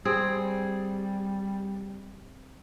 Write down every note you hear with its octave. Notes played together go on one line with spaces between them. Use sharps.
G3 C4 G#4